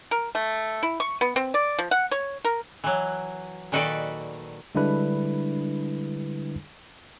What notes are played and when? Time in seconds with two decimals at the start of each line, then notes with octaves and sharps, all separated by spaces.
0.11 A#4
0.35 A3
0.83 E4
1.00 C#6
1.21 B3
1.36 C4
1.54 D5
1.79 F3
1.91 F#5
2.11 C#5
2.45 A#4
2.84 E3 F#3
3.72 A#2 D#3 F#4 A4 B4 D5
4.75 D3 G3 G#3 D4 E4 B4